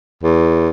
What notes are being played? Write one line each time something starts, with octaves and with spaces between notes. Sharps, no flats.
E2